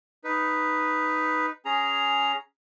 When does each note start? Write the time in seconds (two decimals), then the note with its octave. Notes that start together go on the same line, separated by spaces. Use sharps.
0.24 D#4 B4
1.65 C#4 G#4 A#5